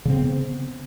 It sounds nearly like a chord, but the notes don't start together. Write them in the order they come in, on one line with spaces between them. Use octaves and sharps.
C#3 C4 B3